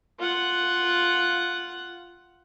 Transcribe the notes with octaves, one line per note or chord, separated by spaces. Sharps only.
F4 F#5